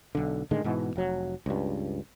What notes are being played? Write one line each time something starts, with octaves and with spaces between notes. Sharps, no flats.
B1 D3
A2 D3 D#3 G#3
G#2 B2 E3
F1 F#3
C#2 G2